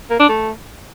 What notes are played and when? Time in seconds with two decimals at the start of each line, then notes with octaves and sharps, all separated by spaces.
0.10 A#3
0.19 D4
0.29 A3